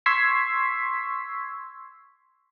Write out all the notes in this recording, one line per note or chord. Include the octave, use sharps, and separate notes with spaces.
C6 C#6 E6 G#6 B6 C7